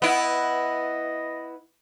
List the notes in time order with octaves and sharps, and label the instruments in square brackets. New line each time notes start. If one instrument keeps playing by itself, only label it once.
[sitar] B3 E4 [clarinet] D#5